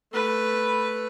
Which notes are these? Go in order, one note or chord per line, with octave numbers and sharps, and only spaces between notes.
A3 B4